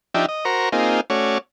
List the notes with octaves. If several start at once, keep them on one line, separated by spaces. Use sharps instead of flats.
F3 D4 D#4 G4 E5
D#5
F#4 A#4 C5 A#5 C#6
A#3 C4 D#4 F4 G#4
A3 C#4 F#4 C#5 D5